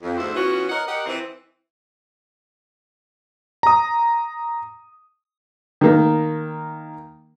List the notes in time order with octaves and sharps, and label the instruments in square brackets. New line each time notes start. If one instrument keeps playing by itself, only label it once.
[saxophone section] F2
D2 G#2 B3 E4 A4 C5
E3 B3 C#4 F4 F#4
A#4 C#5 D#5 F#5
G4 A#4 D#5 F#5
E3 C4
[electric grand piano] A#5 D#6
[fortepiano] D#3 A#3